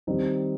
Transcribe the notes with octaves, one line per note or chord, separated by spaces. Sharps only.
D#3 G3 C4 D#4